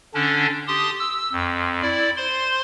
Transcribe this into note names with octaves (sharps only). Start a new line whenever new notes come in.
D3 C#4 D4
G4 A5 C6 D#6
E6
F2
E4 D5
C5 C6